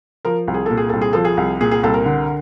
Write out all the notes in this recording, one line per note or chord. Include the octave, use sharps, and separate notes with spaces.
F3 A#4
C2
G#4
A#2 A4
G#4
C2 A4
G#4
F3 A4
G#4
C2
A#2 G#4
G#4
C2 A4
A#4
D3